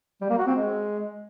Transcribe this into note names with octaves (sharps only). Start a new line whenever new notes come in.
G3
A#3
F#4
C4
G#3